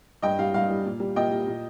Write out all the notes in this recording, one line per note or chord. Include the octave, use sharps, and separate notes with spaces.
G2 D#5 G5
G3 F5
G2 F5
G3
A#2
G3
A#2 D#5 G5
G3
A#2